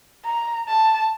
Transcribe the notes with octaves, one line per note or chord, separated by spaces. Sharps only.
A#5
A5